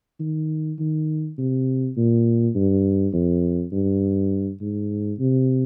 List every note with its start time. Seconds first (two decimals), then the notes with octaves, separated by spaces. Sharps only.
0.20 D#3
0.79 D#3
1.38 C3
1.97 A#2
2.55 G2
3.13 F2
3.72 G2
4.61 G#2
5.19 C3